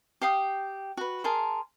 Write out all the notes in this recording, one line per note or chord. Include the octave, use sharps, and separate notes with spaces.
G4 F5 G5 D#6
F#4 B4
G#4 A#4 A5 C6